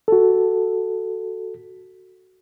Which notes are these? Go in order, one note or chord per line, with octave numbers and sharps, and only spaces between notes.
F#4 A4